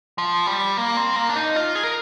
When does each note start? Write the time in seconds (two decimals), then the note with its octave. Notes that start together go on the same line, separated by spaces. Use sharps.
0.18 F3
0.47 G3
0.77 A#3
0.97 C4
1.16 A#3
1.29 D4
1.35 D#4
1.56 F4
1.75 G#4
1.84 A#4